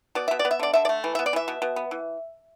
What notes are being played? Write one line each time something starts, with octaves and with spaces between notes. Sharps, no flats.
B2 D5
B2 E5
D5
B3
E5
D3 D5
D3 E5
D5
A3
E3
B3 E5
D5
E3 E5
B2
B2
B3
E3